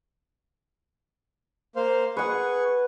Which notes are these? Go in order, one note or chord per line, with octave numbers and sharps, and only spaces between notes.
A#3 C5 F5
G#4 B4 F#5 C#6